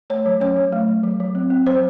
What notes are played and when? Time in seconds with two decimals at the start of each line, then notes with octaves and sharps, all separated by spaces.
0.10 A3 C#5
0.26 F#3
0.40 C#4 C#5
0.56 F#3
0.72 A3
0.88 F#3
1.03 F#3
1.20 F#3
1.35 C4
1.50 C4
1.66 F#3 C5